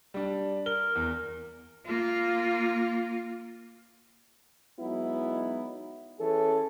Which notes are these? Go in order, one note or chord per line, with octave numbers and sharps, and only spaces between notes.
G3 D4
A#4 G7
E2
A#3 F4
F#3 G#3 B3 D#4 E4
E3 C#4 G#4 A4